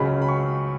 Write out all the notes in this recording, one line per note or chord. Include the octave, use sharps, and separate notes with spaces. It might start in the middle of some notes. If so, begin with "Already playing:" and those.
Already playing: C#2 C#3 F#3 C#4 B5
B5
C#6